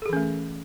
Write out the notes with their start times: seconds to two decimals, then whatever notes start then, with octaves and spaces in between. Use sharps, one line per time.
0.02 A4
0.06 G#4
0.09 E3
0.13 C#4
0.16 A3